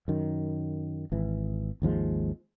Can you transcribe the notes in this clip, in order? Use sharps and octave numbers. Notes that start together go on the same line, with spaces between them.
F#2 D#3
G#1 E3
G#1 D#2 F3 G#3